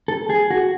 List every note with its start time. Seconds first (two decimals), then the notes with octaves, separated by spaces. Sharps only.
0.08 A4
0.30 G#4
0.50 F#4